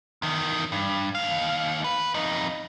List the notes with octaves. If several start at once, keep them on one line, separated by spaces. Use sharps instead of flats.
E2 D#3
G2
D#2 F5
B4
F2 D#4